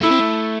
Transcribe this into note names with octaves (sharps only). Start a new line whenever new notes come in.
A3 E4
C4
A3